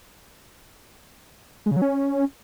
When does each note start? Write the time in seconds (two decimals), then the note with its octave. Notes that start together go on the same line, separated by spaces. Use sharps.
1.66 G#3
1.71 C#3
1.77 F#3
1.82 C#4